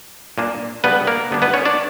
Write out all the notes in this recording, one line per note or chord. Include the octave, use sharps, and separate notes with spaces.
A#2 A#3 D4
C#3 G3 B3 D4 B4
A#3 A#4
D3 G3 B3 D4
B3 B4
C#4 C#5
D4 D5